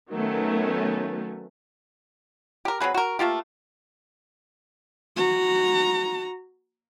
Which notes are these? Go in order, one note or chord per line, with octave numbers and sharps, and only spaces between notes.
D#3 F#3 A3 B3 C#4
G4 A#4
F#3 C4 G#4 B4
F#4 A#4
A3 A#3 F4 G4
F#4 A#5